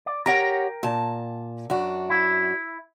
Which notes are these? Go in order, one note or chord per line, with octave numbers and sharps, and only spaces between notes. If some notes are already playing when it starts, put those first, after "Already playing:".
D5
G4 A#4 C#5 F#5 G5 A#5
A#2 A5
F#2 D4 F#4
E4 E5